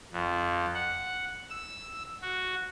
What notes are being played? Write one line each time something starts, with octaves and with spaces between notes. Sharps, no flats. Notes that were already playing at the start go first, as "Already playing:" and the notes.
F2
F#5
E6
F#4